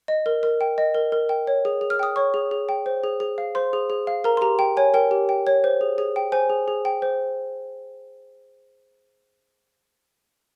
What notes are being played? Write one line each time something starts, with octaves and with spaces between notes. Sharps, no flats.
D#5
A#4
A#4
G5
D#5
A#4
A#4
G5
C#5
G#4
G#4
F6
G5 D#6
C#5 C#6
G#4
G#4
G5
C5
G#4
G#4
F5
C5 C6
G#4
G#4
F5
A#4 A#5
C6
G4 A#5
G5
C#5 G#5
A#4 G5
G4
G5
C#5
C5
G#4
G#4
G5
C5 G#5
G#4
G#4
G5
C5